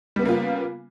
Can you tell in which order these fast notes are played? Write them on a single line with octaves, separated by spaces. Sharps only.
G3 B3 C#3 A#3 F4